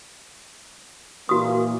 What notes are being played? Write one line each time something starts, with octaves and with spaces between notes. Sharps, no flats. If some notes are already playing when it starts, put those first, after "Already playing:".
A#2 E3 A#3 F#4 D#6